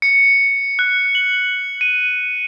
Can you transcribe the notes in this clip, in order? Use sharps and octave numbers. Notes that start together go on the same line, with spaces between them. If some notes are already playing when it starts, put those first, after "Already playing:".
C#7
F#6
F#7
D#7